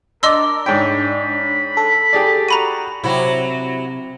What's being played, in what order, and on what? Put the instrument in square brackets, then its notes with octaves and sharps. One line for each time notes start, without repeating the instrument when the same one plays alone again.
[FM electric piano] D4 D5 [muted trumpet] A#4 [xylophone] D#5 C6 E6
[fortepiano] G#2 C#5 G5 [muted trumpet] B5
[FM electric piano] A4
[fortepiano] G4 G#4 D5
[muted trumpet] F#4 [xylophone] A#5 B5 D#7
[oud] C3 [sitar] F#3 E4